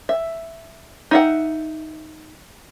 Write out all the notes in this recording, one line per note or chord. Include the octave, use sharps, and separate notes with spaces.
E5
D#4 E5 F#5